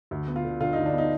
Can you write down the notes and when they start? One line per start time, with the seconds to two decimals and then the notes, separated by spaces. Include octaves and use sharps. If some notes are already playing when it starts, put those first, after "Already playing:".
0.11 D2
0.28 B3
0.36 F4
0.44 D3
0.60 D3 F4
0.73 D2 D#4
0.86 D4
0.93 B3 D#4